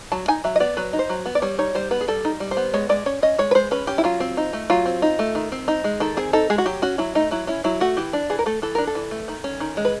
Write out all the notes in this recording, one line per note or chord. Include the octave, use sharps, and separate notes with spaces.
F#3 A5
D#4 G#5
F#3 E5
D#5
B3 D5
F#3 B4
D#4
C5
F#3
B3
D5
G3 C#5
D#4 C#5
G3 C5
B3 B4
G#4
G3 A4
D#4
G3
C5
B3
G#3 C#5
G#3 D5
C#4 C#5
C#4 D#5
G#3 C#5
B4
G#3 C5
C#4 B4
C#4 G4
E4
F#3 F4
C4
D#4
A3
F#3 F4
C4
D#4
A3
D#3
C4
D#4
G#3
D#3 A4
C4 G#4
D#4 A4
G#3 G#4
F#4
F#3 G4
C#4 F#4
F#3 E4
A3 D#4
F#3 E4
C#4 E4
F#3 E4
A3 F#4
E3 G4
D4
E3 G#4
A#4
A3 A4
E3 A4
D4 A#4
A4
E3
A3
D#3
C#4
D#3
G#3
B4